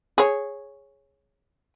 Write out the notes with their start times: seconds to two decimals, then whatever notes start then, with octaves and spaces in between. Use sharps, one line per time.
0.18 G#4 C#5